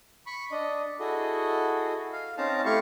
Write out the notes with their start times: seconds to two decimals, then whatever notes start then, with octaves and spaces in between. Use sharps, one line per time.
0.26 B5 C#6
0.51 D4 D#5
0.99 E4 F#4 G#4 A4 D#5
2.12 F5
2.37 C4 C#4 D#4 F5 A5 A#5
2.65 A3 E4 G4 F5 C#6